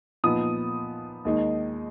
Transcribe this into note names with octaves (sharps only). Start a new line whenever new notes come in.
A#2 F3 B3 D#4 D#6
D#2 D#3 G#3 D#4